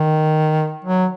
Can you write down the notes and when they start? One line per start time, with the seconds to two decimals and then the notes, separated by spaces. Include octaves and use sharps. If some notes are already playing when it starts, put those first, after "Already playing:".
Already playing: D#3
0.84 F#3